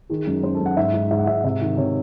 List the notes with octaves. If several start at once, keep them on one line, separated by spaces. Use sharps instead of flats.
D#3 G#4
F#2
F#2 C5
A4
F#2
F#5
G#2 E5
G#2
G#2 E5
F#5
G#2 E5
C3 E5
D#3
C3 C#5